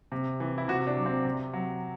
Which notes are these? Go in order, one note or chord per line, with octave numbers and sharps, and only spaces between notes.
C3
E3
E4
C3 F#4
D4
F#3
C4
C3
F#3